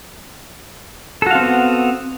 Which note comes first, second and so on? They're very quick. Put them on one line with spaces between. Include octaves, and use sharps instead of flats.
A4 F#4 F5 C4 B3